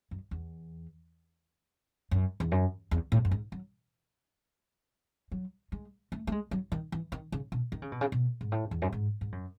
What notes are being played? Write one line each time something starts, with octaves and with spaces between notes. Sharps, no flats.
F#2
E2
F#2
E2
F#2
E2
A2
F#2
G#2
F#3
F#3
G#3
A3
A3
G#3
F#3
D#3
E3
D#3
C#3
B2
D#3
C#3
B2
C#3
B2
G#2
A2
E2
F#2
G#2
G#2
F#2